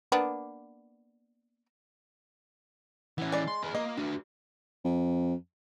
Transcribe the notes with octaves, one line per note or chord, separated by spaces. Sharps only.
A#3 B3 D4
E3 B3 C#4 E4
G#3 D5
C6
G#4 B4
A#3 F4 D#5
D4 F#4 B4
F2